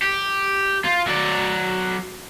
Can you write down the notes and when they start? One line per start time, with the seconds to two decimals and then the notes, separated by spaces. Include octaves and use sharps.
0.02 G4
0.84 F4
1.07 F#3 D5